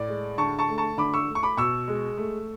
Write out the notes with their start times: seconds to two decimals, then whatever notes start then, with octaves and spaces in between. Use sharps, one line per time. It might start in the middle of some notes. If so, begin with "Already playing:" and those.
Already playing: A2 D5
0.08 G#3
0.38 D3 A5 C#6
0.59 A5 C#6
0.69 A3
0.78 A5 C#6
0.97 D3 B5 D6
1.14 C#6 E6
1.28 A3
1.35 C#6
1.43 B5 D6
1.57 B2 C#6 E6
1.88 G#3
2.18 A3